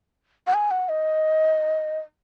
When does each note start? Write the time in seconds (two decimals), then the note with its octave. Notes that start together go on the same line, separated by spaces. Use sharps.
0.47 F#5
0.54 G#5
0.71 F#5
0.89 D#5